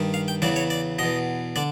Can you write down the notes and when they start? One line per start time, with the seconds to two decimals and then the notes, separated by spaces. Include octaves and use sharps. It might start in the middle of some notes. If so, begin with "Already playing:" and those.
Already playing: G2 D#3
0.14 F5
0.28 G5
0.42 E2 C#3 E3 D5
0.56 C#5
0.70 D5
0.99 E2 B2 D#5
1.56 D3 D5